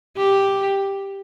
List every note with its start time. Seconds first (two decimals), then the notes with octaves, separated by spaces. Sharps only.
0.18 G4